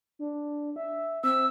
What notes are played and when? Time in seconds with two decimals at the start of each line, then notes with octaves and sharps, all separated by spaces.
0.19 D4
0.76 E5
1.24 C4 E6